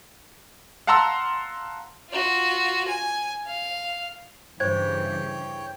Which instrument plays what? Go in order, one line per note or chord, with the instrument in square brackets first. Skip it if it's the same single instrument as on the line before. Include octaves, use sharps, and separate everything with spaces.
[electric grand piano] F5 F#5 A5 A#5 C6 E6
[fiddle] F4 F#4
G#5
F5
[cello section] G2 C#3 E3 [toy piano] C5 [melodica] C#5 G5 [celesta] G#6